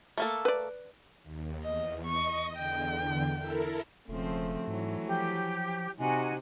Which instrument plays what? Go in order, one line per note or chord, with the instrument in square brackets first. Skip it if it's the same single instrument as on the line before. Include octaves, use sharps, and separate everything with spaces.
[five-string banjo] A3 A#3 A4
[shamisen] B4 D5
[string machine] D#2
[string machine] E2 [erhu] D#5
[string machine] D#5 [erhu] C#6
[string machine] E2 D3 [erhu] G5
[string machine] E4 A4 A#4
[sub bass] E1 [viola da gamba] C#3 F3 C4 [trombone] A3
[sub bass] G#2 [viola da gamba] E3 F#3
[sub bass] F3 [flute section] G4
[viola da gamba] C3 [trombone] D#4 [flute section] F#4 G#5